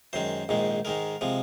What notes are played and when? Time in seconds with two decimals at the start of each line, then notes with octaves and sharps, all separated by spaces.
0.13 F#2 D#3 G#3 C5
0.49 A#1 G#2 D#3 G#3
0.85 G#2 D#3 G#3 A#4
1.21 C3 F3 G#3